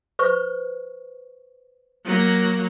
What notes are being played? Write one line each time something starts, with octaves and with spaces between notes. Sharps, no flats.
B4 C5 C#6
F#3 A#3